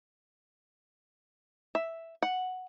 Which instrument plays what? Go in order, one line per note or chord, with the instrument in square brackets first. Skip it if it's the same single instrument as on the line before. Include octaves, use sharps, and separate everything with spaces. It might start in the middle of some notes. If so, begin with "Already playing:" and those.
[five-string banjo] E5
F#5